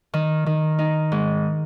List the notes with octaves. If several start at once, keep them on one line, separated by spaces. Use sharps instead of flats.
D#3
D#3
D#4
G#2